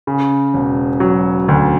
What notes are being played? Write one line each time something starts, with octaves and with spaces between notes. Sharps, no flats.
C#3
E1
F#3
D2